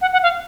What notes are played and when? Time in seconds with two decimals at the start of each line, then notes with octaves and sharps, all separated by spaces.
0.01 F#5
0.13 F#5
0.23 F5